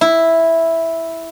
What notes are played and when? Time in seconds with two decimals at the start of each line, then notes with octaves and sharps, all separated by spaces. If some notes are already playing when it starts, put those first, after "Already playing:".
0.01 E4